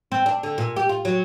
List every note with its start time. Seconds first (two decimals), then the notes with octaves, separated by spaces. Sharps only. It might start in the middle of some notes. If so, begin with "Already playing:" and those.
0.12 C4
0.26 D4
0.43 D3
0.58 A#2
0.77 G4
0.89 F4
1.05 F#3